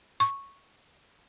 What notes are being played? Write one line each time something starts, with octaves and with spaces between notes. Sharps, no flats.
C#6